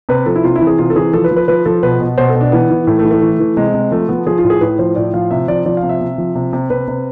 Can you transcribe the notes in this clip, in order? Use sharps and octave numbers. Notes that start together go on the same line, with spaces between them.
C3 B4
F3 A4
E4
C3 F4
E4
E3
G#4
C3 F4
A4
E3 G#4
F3 A4
B4
F3
B4
F3 B4
F3 A4
B2 B4
B2
B2 C5
A4
B2
D4
E3 B3
E3
A2 A3
A3
E3
A3
E3
E3
C3 G#3
C3
F3 A3
F3 B3
F3 G#4
F4
A2
G#4
A2 B4
F3 C5
A2 D5
F3 F5
C3 E5
F3 D5
F3 D5
F5
C3
E5
C3
F3
C3
C3
C3 B4
C3